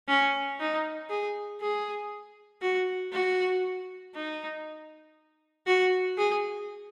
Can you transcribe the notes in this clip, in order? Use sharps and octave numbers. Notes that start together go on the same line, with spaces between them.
C#4
D#4
G#4
G#4
F#4
F#4
D#4
F#4
G#4